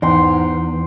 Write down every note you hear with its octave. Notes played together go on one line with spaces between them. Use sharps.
E2 G#2 F#5 G5 C6